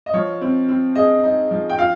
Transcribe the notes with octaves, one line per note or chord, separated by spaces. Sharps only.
D#5
F3 C#5
C4
C4
G#4 D#5
D#4
F3
G5
F4 F5